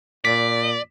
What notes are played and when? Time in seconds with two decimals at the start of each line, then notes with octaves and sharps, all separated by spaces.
0.25 A#2 D5 B6